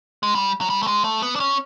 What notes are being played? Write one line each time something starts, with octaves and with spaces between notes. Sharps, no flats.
G#3
G3
F#3
G3
A3
G#3
A3
B3
D4
C#4